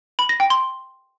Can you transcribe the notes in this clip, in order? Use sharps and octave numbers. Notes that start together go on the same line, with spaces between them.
B5
A#6
G5
C6